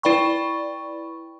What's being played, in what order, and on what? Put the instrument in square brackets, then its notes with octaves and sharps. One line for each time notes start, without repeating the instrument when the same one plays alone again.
[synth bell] E4 B4 D5 G5 B5 C#6